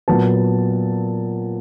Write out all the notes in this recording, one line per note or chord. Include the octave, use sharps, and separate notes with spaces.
A#2 F#3 B3 A5